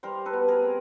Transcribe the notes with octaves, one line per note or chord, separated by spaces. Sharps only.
G3 A#4 C5
A4 B4
B2
G#4 A#4
C4